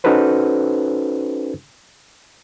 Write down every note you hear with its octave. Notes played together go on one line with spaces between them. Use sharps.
C#4 D#4 F#4 A4 B4 C5